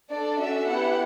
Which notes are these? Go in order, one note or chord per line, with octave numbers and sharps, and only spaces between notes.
D4 A4 D5
C#4 F#4 A4 E5
B3 E4 G4 F#5